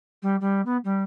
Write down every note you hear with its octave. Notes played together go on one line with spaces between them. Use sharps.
G3
G3
B3
G3